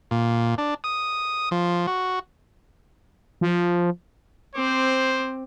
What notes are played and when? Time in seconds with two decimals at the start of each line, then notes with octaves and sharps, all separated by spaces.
0.11 A#2
0.58 D4
0.84 D#6
1.51 F3
1.87 F#4
3.41 F3
4.56 C4 C5 D6